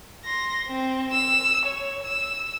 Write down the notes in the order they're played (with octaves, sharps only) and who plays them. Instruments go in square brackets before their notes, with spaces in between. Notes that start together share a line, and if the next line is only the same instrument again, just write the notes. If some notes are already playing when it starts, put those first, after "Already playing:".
[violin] C6 A#6
C4
E6
C#5
E6